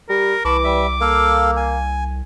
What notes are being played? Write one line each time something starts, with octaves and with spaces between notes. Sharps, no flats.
G3 A#4
C2 E3 A5 B5 C#6 D6
G3 E5
A#3 A4 F5
G#5